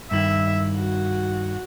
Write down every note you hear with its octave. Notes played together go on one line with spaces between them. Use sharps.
G2 D#3 E4 E5
F#4